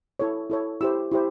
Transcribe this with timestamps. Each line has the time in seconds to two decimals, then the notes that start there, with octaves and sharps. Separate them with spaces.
0.19 E4 A4 C#5
0.50 E4 A4 C#5
0.81 E4 G4 C5 E6
1.11 E4 G4 C5